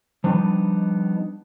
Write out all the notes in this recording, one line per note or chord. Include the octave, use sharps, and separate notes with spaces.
F3 G3 B3 D4 D#4